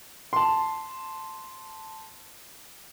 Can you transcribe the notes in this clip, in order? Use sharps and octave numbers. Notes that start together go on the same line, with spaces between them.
A5 C6